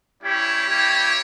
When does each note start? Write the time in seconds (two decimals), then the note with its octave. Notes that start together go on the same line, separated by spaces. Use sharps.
0.22 G3 C#4 E4 G4 C#5
0.68 G3 A#3 E4 G4